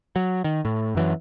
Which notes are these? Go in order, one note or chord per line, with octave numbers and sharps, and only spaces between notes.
F#3
D#3
A2
F#2 E3 F#3